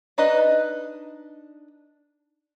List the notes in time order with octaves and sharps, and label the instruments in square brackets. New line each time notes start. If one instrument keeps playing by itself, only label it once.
[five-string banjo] D4 D#4 B4 D#5